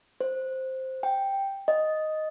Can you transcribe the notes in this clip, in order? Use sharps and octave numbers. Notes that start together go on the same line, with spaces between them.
C5
G5
D#5